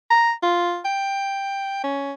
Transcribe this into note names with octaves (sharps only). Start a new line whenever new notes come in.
A#5
F4
G5
C#4